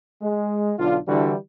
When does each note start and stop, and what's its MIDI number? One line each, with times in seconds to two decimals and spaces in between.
0.22 0.73 56
0.79 0.99 35
0.79 0.99 50
0.79 0.99 62
0.79 0.99 65
1.08 1.34 50
1.08 1.34 52
1.08 1.34 55
1.08 1.34 62
1.08 1.34 64
1.08 1.34 66